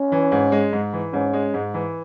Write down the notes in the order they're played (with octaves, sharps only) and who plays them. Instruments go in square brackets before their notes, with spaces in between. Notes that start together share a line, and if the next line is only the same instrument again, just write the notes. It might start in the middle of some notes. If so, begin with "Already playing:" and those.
Already playing: [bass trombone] C#4
[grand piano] E3
G#2
G#3
G#2
E3
[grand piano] G#2 [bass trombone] C#4
[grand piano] G#3
G#2
E3